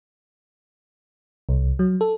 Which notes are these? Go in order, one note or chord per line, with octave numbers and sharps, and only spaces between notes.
C2
F#3
A4